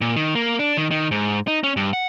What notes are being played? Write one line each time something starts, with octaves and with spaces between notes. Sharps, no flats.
A#2
D#3
A#3
D4
D#3
D#3
G#2
D#4
C#4
G2
F#5